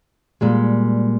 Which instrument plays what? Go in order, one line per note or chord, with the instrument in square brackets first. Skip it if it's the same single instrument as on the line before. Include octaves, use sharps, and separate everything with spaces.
[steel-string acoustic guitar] A#2 G3 G#3